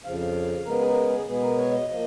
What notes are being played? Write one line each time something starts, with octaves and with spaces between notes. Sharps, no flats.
F2 C#3 F3 F5
C#3 G#3 B3 A#4
G#4
A#4
G#4
B2 G#3 B3 G#4
A#4
C#5
D#5
F3 A#3 D#5